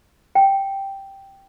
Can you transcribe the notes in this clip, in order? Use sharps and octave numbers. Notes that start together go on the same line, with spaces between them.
G5